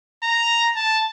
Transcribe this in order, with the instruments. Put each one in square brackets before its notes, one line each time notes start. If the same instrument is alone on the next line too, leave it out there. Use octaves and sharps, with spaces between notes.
[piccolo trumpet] A#5
A5